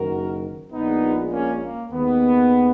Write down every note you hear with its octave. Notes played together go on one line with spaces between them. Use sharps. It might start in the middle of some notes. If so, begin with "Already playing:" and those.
Already playing: F#1 F#2 D#3 F#4 A#4
A#1 A#2 G#3 B3 D#4
A#3 C#4
A#3
D#2 D#3 G#3 B3